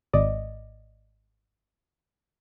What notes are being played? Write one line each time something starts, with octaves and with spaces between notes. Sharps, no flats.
G#1 D5 D#5